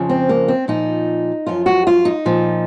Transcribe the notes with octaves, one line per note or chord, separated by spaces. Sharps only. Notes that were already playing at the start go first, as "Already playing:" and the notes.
Already playing: F2 C#3 F3
C4
A#3
C4
A#2 F3 D#4
F#2 F3 F4
F#4
F4
D#4
A#2 F3